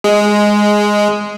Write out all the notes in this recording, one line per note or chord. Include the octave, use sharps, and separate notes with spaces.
G#3